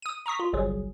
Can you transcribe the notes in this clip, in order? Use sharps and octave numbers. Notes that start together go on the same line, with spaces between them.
D#6 D#7
A#5 C#6 D#6 B6
F4
G1 C2 F#3 G#4